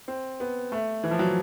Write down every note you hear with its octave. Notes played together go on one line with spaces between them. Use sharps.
C4
B3
A3
E3
F3
F#3